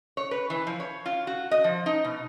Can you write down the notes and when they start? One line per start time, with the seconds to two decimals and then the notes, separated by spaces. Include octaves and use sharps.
0.17 C#5
0.31 B4
0.50 E3
0.67 F3
0.80 C#5
1.06 F4
1.27 F#4
1.51 D#5
1.64 F3
1.86 D#4
2.05 B2